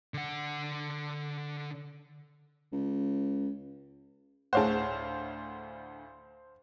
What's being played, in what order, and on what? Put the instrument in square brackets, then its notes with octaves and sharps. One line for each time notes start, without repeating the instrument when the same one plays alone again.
[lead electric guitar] D3 F#5
[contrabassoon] C#2
[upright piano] D2 A2 [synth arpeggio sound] G#4 C#5 F#5 [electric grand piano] C5 F5 A5